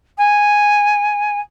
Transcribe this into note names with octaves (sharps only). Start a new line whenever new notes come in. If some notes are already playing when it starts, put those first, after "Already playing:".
G#5